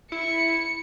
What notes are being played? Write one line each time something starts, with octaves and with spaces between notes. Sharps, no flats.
E4 C#7